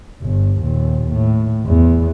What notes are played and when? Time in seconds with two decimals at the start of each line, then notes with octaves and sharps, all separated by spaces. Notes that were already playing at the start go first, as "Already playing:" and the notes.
0.22 G1
0.61 D#2 A#2
1.12 A2
1.67 E2